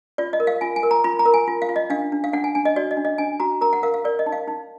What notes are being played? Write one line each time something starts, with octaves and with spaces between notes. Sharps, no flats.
F4 D5
D#5
A#4
F5
F4 G#5
G#5
A#4
A#5
F4 B5
A#5
A#4
G#5
F4
F5
F4
D#5
D4 F5
D4
F5
D4 F#5
G#5
D4 G#5
D#5
F#4 D5
D#5
D4
D#5
D4 G#5
F#4 A#5
A#4 A#5
F#5
A#4 F5
F5
A#4 D5
D#5
D#4
F5
D#4